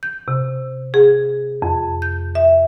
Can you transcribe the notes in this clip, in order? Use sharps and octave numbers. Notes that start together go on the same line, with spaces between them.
G6
C3
G#4
F2
G6
E5